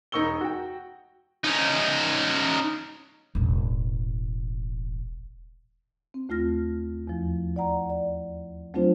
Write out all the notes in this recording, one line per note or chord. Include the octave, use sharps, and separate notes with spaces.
E1 D#4 A#4 C#6 E6 G7
F#4 G5
C#4 D#4
E1 A1
C4
D#2 A3 F4 F6 A#6
E2 F3
D5 F#5 A#5
D5
F#3 A3 C4 D4 F4 C5